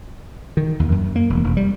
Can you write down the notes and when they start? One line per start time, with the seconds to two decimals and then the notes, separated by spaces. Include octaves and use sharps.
0.57 D#3
0.80 D#2
0.92 F#2
1.16 A#3
1.30 E1
1.44 F1
1.57 G3